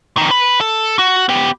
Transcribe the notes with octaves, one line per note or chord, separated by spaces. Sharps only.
F2 D#3
B4 B5
A4
F#4
B3 G4